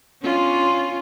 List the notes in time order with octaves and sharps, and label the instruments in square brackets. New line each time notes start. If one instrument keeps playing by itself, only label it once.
[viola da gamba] C#4 D4 F4